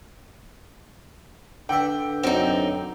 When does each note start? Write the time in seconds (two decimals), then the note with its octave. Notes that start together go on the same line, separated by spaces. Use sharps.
1.69 D3 D4 B4 E5 G5
2.23 F#2 D3 F#3 C4 D#4